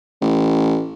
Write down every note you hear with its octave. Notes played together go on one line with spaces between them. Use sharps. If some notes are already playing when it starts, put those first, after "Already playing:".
A1